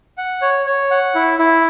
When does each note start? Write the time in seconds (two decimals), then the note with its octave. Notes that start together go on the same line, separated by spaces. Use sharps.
0.18 F#5
0.42 C#5
0.66 C#5
0.91 F#5
1.15 E4
1.39 E4